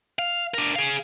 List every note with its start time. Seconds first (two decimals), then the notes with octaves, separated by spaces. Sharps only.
0.19 F5
0.54 D4 A#4
0.76 G#4 F5